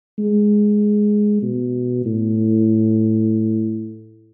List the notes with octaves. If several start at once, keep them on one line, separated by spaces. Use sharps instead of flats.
G#3
B2
A2